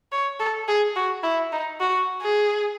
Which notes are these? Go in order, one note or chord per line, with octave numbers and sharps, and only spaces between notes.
C#5
A4
G#4
F#4
E4
D#4
F#4
G#4